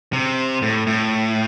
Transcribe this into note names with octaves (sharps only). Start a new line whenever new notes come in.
C3
A2
A2